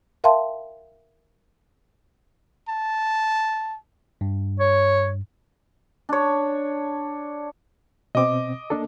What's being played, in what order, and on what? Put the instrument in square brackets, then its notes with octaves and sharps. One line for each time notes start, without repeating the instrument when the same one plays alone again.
[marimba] A#4 E5 F5 G5 A5 C6
[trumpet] A5
[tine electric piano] G2
[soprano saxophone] C#5
[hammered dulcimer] D4 C#5
[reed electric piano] B2 C4 [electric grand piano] D#5 D6
[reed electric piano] A#3 D4 A4